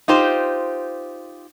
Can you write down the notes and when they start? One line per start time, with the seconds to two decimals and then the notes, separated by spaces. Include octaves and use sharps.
0.08 D#4 F4 G4 C5